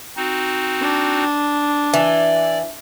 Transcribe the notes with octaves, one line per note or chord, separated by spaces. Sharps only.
C4 D#4 F#4
D4
E3 D5